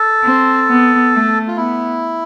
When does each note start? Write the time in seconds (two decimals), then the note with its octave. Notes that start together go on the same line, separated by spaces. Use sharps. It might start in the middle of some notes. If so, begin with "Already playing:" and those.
Already playing: A4
0.24 C4
0.68 B3
1.13 A3
1.48 F4
1.56 B3 E4